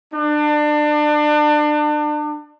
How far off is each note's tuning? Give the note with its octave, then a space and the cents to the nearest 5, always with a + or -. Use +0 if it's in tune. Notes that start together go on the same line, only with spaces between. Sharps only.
D4 +30